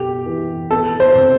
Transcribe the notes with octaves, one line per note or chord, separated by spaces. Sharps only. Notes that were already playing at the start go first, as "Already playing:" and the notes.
Already playing: B2 G4 A4
E3
B3 A4
C5
C3